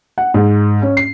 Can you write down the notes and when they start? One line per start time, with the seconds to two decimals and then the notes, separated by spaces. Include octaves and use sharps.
0.18 F#5
0.34 G#2
0.82 C#4
0.97 C7